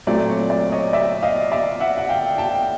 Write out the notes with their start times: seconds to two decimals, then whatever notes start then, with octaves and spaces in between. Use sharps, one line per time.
0.07 A#2 F#3 A3 C4 D5
0.29 C#5
0.50 D5
0.72 C#5 D#5
0.93 D5 E5
1.22 D#5 F5
1.52 D5 E5
1.80 E5 F#5
1.98 F#5
2.09 F5 G5
2.38 G5 A5